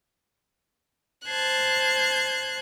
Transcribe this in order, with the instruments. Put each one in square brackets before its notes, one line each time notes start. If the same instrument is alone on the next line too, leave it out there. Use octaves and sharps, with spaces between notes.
[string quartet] C5 A5 F#6 G#6